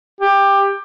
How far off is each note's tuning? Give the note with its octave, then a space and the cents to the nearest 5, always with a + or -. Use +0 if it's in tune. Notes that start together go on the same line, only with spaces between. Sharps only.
G4 +15